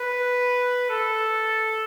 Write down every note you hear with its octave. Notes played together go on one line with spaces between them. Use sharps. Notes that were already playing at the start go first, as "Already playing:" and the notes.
Already playing: B4
A4